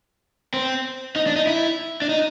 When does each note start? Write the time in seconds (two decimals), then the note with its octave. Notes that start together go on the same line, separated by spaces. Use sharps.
0.54 C4
1.16 D#4
1.27 D4
1.36 D#4
1.47 E4
2.02 D4
2.09 D#4